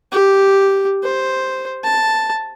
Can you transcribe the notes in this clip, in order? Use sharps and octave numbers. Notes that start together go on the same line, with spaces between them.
G4
C5
A5